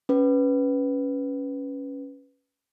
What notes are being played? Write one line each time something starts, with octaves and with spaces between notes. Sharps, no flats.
C#4 B4